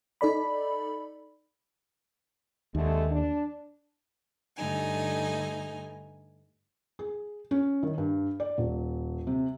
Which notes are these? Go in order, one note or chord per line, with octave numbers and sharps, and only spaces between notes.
D#4 A4 D5 B5
D#2 D3 G#3 A3
D4
G2 D3 A3 D#4 G#5
G#4
C#4
D#3
G2
D5
D#1
C3